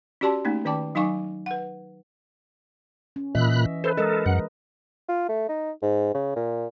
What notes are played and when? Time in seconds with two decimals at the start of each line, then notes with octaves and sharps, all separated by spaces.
0.21 C#4 F#4 G4 D5 A5 C6
0.45 A3 A#3 C#4 D#4
0.65 D#3 C#4 D5 G5 A5 D6
0.95 F#3 D#4 F5 G#5 C#6 D6
1.46 B4 F#5
3.16 C#4
3.35 A#2 E3 D#5 E5 B5 F#6
3.84 A4 B4 C5
3.97 G#3 A4 A#4 D#5
4.26 F#2 F#5
5.09 F4
5.29 A3
5.49 D#4
5.82 G#2
6.15 C#3
6.36 A#2